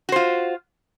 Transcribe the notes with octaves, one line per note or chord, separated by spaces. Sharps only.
F4 F#4 C5